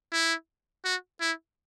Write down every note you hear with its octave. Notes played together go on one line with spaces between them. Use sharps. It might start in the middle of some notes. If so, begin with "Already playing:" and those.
E4
F#4
E4